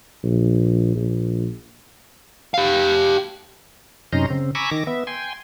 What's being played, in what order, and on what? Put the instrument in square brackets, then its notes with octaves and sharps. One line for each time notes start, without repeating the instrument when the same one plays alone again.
[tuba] A#1
A#1
[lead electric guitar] G4 F5
[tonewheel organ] F#2 C3 C#4 D#4 A#5 C6
C#3 C4
G#5 A#5 B5 C#6 D6 E6
D#3 D6 A#6
B3 E5
G5 G#5 C6